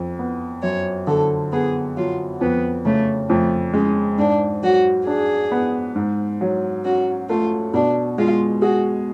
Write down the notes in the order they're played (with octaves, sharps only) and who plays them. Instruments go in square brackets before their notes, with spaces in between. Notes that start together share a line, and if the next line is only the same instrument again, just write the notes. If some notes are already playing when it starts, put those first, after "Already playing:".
Already playing: [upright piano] F2
B3
[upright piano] F#2 [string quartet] C#5
[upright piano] D3 [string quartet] A4
[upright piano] B3 [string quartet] G#4
[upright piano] F#3 [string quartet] F4
[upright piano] F2 [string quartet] B3
[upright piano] C#3 [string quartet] A3
[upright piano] F2 [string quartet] A3
[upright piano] G#3 [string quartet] C#4
[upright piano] G#2 [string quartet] D4
[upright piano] F#3 [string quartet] F#4
[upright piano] D4 [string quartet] G#4
[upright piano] B3
G#2
F#3
[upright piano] C#4 [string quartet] F#4
[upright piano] A3 [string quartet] F4
[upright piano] B2 [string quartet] D4
[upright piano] G#3 [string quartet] F4
[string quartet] F#4 [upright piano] G#4